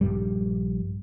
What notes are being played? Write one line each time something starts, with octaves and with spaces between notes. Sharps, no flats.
A#1 G2 G3